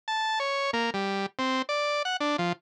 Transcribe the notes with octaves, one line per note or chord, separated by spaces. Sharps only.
A5
C#5
A#3
G3
C4
D5
F#5
D4
F3